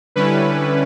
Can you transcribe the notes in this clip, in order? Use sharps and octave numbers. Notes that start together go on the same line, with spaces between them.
D3 G3 C#4 E4 B4